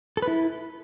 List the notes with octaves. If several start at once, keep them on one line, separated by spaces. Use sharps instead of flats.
A4
B4
E4